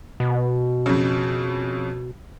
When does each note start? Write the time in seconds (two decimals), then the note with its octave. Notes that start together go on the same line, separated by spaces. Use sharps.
0.20 B2
0.86 F2 C#3